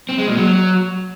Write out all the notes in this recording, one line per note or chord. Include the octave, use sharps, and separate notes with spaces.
C4
G#3
A#2
F#3